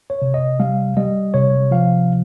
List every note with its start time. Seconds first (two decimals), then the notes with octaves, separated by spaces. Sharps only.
0.10 C#5
0.22 C3
0.34 D#5
0.60 G3 F5
0.97 G3 D#5
1.34 C3 C#5
1.71 F3 F5